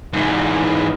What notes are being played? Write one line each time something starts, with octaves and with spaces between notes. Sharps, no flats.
G#2 E3